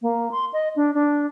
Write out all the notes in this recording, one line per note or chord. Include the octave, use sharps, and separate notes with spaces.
A#3
C6
D#5
D4
D4